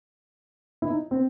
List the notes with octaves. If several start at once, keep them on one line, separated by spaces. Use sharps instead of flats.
E4
D#4
C4